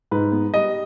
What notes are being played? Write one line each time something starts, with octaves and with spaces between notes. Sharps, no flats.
G#2 B4
B3
G3 D#5